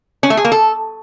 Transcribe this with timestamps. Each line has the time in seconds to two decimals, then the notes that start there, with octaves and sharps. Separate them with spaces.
0.23 C#4
0.30 A3
0.37 G#4
0.45 A#3
0.52 A4